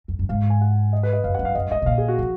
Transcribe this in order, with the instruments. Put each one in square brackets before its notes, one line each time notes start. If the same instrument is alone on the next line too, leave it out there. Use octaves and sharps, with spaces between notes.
[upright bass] F2
F#2
[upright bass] G#2 [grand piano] F5
[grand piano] G#5
F#5
D#5
B4
D#5
[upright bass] F#2 [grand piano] F5
[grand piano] F#5
[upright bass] F#2
[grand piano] F5
[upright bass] F#2 [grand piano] D#5
[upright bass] G#2 [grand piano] D#5
[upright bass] B2
[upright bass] A#2 [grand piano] F5
[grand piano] G#4
F#4
[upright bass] F3